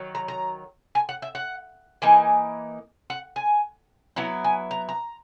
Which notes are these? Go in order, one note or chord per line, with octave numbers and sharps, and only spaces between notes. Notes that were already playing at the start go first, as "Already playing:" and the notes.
Already playing: D#3 F#3
A#5
A#5
G#5
F#5
E5
F#5
E3 A#3 D#4 G#5
F#5
G#5
F#3 B3 E4 A#5
G#5
A#5
A#5